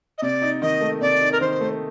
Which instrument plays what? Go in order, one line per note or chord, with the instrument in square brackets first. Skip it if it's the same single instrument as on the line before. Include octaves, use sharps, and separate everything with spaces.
[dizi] D#5
[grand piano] C3 [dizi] D5
[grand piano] D#4
[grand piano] D#3 [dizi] D#5
[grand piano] A3
[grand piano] C3 [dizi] D5
[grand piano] D#4
[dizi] A#4
[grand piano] D#3 [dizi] C5
[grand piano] A3